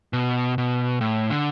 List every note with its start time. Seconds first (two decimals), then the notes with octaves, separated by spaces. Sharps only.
0.13 B2
0.58 B2
1.01 A2
1.30 D3